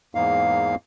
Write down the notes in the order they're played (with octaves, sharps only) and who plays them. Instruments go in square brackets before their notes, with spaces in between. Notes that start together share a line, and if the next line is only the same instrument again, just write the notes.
[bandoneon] E2 G#2 A#3 F5